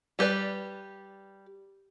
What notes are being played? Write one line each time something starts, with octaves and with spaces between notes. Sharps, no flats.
G3 G4 B4 D5